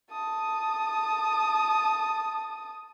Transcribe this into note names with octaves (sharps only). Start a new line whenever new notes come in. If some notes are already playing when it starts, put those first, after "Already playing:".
A5 D#6